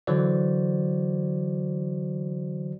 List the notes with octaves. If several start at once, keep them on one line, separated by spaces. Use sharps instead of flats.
D3 E3 F#3 F#4 C5 D5